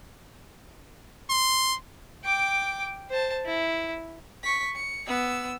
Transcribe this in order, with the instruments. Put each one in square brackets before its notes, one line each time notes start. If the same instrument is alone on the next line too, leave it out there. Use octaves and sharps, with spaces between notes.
[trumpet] C6
[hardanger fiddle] G5 D6
C5 A5
E4
[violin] C#6 B6
C#7
B3 E6